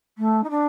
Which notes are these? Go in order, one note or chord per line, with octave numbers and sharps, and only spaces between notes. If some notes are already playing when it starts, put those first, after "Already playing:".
A3
D#4
D4